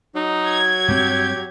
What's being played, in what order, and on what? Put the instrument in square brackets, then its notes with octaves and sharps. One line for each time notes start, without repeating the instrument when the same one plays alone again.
[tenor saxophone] F#3 [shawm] D#4
[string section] G#6
[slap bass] G2 C4 [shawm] G4